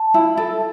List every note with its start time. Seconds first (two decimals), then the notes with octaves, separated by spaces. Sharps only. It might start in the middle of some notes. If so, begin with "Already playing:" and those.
Already playing: A5
0.14 E4
0.37 A4